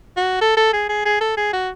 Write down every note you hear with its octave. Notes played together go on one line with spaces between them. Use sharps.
F#4
A4
A4
G#4
G#4
G#4
A4
G#4
F#4